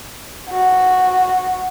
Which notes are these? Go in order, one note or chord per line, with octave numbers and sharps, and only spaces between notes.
F#4